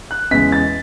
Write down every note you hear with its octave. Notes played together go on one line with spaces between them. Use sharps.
F#6
E2 C#3 G#3 B6
A6